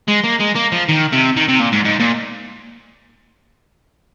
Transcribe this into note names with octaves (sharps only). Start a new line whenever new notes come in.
G#3
A#3
G#3
A#3
F3
D#3
C3
D#3
C3
A#2
G#2
G#2
A#2